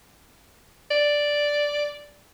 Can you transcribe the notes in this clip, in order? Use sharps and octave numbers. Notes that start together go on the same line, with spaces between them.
D5